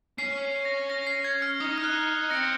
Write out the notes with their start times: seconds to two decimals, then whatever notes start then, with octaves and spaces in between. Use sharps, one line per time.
0.18 C#4 C7
0.65 A#6
0.90 A#6
1.07 C7
1.24 G#6
1.42 F6
1.60 D#4 D#6
1.78 F6
1.84 F#6
2.30 C4 A#6 C#7